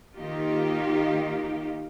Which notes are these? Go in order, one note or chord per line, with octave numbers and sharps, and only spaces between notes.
D#3 A#3 D#4 F4 G4